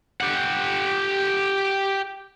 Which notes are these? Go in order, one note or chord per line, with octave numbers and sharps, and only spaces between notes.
G4 F#5